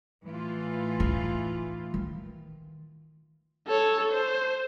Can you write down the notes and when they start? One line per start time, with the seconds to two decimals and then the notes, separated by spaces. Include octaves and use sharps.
0.24 A2 E3 F4
1.00 D#4
1.94 D#3
3.67 A4 C#5
4.12 C5